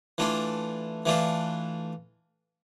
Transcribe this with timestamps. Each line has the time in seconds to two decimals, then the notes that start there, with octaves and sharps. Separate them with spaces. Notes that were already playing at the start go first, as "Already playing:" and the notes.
0.18 E3 A3 D4 F4
1.05 E3 A3 D4 F4